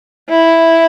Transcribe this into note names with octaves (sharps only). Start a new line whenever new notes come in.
E4